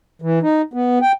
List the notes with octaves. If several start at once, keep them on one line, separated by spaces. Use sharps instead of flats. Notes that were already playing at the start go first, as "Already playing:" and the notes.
E3
D#4
B3
G5